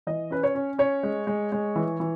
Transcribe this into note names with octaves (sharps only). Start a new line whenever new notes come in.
E3 D#5
C#4 B4
C#5
C#4
C#4 C#5
G#3
G#3
G#3
E3
E3